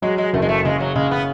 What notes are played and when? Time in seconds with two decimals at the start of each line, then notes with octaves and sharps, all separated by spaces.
0.02 F#3 G#3
0.18 G#3
0.33 F#1 A3
0.42 G#3
0.49 A3
0.64 C#3 G#3
0.80 F#3
0.96 C#3 G#3
1.11 B3